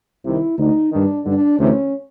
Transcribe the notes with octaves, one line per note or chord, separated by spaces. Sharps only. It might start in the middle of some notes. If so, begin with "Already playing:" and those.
C2 C3 D#3 E4
D2 D3 D#4
G2 D#3 D4
G2 D3 D4
D2 C3 E3 C#4